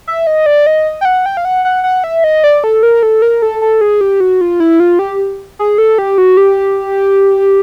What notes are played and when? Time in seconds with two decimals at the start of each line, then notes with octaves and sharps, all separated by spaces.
0.07 E5
0.27 D#5
0.46 D5
0.67 D#5
1.01 G5
1.05 F#5
1.26 G5
1.37 F5
1.45 F#5
1.65 F#5
1.84 F#5
2.04 E5
2.24 D#5
2.44 D5
2.64 A4
2.83 A#4
3.03 A4
3.22 A#4
3.42 A4
3.62 A4
3.81 G#4
4.01 G4
4.20 F#4
4.41 F4
4.60 E4
4.80 F4
4.99 G4
5.59 G#4
5.78 A4
5.98 G4
6.18 F#4
6.37 G4